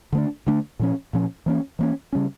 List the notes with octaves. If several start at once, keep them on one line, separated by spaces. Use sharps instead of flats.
D3 A3 D4
D3 A3 D4
A#2 F3 C#4
A#2 F3 C#4
E3 A#3 C#4
E3 A#3 C#4
C#3 G3 C#4